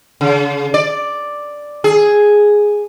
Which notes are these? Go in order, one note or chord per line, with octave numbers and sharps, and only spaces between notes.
C#3
D5
G#4